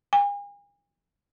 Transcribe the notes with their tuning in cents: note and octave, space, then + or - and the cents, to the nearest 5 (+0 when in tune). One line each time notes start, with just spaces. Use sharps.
G#5 -40